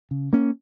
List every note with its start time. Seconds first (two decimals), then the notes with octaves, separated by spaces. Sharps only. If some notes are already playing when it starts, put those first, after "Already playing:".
0.11 C#3
0.33 A#3 C#4